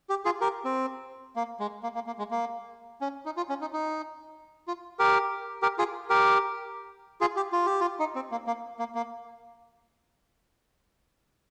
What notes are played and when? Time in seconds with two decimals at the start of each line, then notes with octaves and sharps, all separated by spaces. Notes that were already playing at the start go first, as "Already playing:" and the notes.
0.10 G4
0.25 F4 G#4
0.41 G4 A#4
0.65 C4
1.36 A#3
1.60 G#3
1.83 A#3
1.95 A#3
2.07 A#3
2.18 G#3
2.31 A#3
3.01 C#4
3.26 D#4
3.37 F4
3.49 C#4
3.61 D#4
3.73 D#4
4.68 F4
4.99 G4 A#4
5.62 G4 A#4
5.79 F4 G#4
6.10 G4 A#4
7.21 F4 G#4
7.36 G4
7.52 F4
7.66 G4
7.81 F4
8.00 D#4
8.15 C4
8.31 A#3
8.47 A#3
8.79 A#3
8.95 A#3